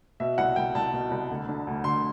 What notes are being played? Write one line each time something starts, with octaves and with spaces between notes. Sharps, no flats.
B2 E5
C2 F#5
C2 G5
C2 A5
B2
C2
D2
D3
D2
D2 C6